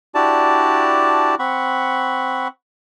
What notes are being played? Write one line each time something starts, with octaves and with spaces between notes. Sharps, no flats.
D4 E4 F#4 G4 D5 A5
C4 F#5 B5 C#6